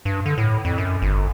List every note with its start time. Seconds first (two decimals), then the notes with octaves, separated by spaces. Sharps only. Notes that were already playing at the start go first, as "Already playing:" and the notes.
0.05 G2
0.26 D3
0.38 A2
0.65 F2
0.78 F#2
1.02 G1